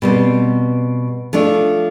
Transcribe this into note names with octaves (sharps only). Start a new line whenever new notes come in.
B2 G3 C4
F3 A3 D4